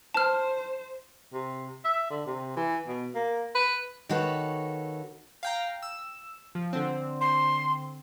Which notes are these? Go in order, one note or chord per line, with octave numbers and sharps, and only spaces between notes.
C5 A5 F6
C3
E5
D3
C3
E3
B2
A#3
B4
D#3 A#3 F#4 A4 B4 C#5
F5 G5 A#5
E6
F3
D3 C4
C6